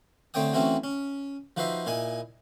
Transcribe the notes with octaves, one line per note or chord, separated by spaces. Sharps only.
D3 A3 C4 C#5 G5 D#6
E3 A3 C4 C#4 E4 F#4
C#4
F3 D#4 F#4 B4 C5 E5
A#2 D#4 E4 G#5